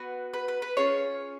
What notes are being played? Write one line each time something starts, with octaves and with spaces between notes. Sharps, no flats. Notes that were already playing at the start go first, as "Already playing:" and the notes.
Already playing: B3 F#4 B4
B4
B4
B4
C#4 F4 G#4 C#5